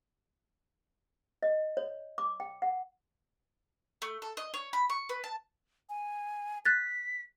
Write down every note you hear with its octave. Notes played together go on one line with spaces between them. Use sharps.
D#5
C#5
D6
G5
F#5
A3
A4
D#5
C#5
B5
C#6
B4
A5
G#5
F#6 A6 B6